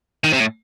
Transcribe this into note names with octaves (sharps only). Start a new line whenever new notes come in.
D#3
C3
A2